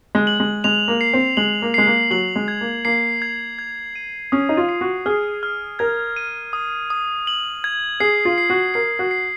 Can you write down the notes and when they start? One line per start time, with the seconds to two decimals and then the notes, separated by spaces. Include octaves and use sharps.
0.15 G#3
0.27 F#7
0.40 G#3
0.64 G#3 F7
0.88 A#3
1.01 C7
1.13 C4
1.37 G#3 F#7
1.62 A#3
1.74 G#3 C7
1.87 A#3
2.11 F#3 F#7
2.36 G#3
2.48 G#6
2.61 A#3
2.85 A#3 C7
3.22 G#6
3.59 G#6
3.95 D#7
4.32 C#4 D#6
4.49 D#4
4.57 F4
4.69 C7
4.81 F#4
5.06 G#4 F6
5.43 F6
5.79 A#4 G#6
6.16 D#7
6.53 D#6
6.90 D#6
7.27 F#7
7.64 G#6
8.00 G#4 C7
8.25 F4
8.38 C7
8.50 F#4
8.74 A#4 C7
8.99 F#4
9.11 C7